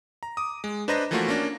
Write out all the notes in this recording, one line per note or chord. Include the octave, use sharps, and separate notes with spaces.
A#5
D6 D#6
G#3
D4 B4 C5 D#5 A#5 A#6
E3 F3 A3 A#3 F4 F#4
A#3 C#4 D4 A#6